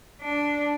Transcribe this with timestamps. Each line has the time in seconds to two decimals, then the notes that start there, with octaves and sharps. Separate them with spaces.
0.22 D4